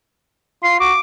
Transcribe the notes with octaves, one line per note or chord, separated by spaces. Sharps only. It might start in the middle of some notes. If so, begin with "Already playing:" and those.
F4 C7
F#4 D6